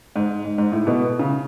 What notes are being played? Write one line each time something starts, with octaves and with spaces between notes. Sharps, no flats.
G#2
G#2
G#2
A2
B2
C#3